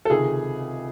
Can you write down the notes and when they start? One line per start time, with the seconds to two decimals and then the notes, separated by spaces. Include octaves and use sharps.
0.05 A4
0.10 C#2 C3 D#3 G#4